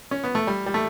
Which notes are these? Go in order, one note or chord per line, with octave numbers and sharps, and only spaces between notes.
C#4
B3
A3
G3
G3
A3